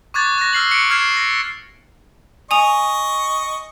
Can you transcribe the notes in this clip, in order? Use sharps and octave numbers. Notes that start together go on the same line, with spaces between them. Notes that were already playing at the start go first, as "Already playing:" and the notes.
C#6 D6 F#6 G#6 A6
F#6 A#6
E6 F6 C7 F#7
C#7 D7
F6 G#6 C7 E7
A#6
D#5 G#5 C#6 D#6 F7